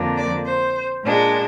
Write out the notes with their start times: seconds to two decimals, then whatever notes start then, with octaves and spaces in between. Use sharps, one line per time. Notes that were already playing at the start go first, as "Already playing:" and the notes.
Already playing: F2 D3 F3 A#3 D4
0.17 D5
0.46 C5
1.04 A#2 G#3 D4